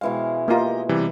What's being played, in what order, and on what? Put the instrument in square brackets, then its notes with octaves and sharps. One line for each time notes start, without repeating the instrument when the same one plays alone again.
[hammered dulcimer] B2 E3 G#3 [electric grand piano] F5
[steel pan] A#3 F4 [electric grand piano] G4 D#5 A#5
[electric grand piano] C3 E3 G3